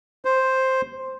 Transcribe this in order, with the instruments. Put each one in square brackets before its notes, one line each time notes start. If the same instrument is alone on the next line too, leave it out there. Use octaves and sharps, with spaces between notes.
[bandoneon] C5